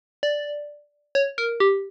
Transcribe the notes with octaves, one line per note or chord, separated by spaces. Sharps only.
D5
C#5
A#4
G4